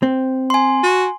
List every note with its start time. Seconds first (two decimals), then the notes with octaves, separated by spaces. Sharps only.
0.03 C4
0.50 G#5 C6
0.83 F#4